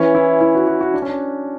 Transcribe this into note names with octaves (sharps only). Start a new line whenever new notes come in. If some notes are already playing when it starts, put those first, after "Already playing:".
Already playing: E3 C#4
E4
E4
F#4
F#4
F#4
D4
C#4
D4